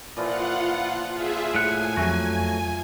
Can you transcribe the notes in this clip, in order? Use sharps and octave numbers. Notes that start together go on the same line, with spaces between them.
A#2 E3 F3 F4 F#5
F4 G#4 E5
A2 F#5 G#5
F2 F#3 A3 F#4